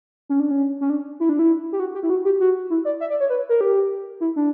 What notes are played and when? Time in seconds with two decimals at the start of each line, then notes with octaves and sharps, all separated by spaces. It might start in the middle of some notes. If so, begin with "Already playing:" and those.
0.29 C#4
0.40 D4
0.51 C#4
0.81 C#4
0.90 D4
1.20 E4
1.29 D4
1.39 E4
1.72 G4
1.80 F#4
1.95 G4
2.03 E4
2.10 F#4
2.25 G4
2.40 F#4
2.70 E4
2.85 D5
3.00 E5
3.10 D5
3.20 C#5
3.30 B4
3.49 A#4
3.61 G4
4.21 E4
4.36 D4